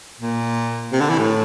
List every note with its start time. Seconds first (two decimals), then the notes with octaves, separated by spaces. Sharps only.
0.20 A#2
0.92 C3
1.01 D3
1.10 E3
1.18 A2